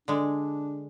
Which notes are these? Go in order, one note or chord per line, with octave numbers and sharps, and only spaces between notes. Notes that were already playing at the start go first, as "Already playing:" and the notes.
D3 G#3 D4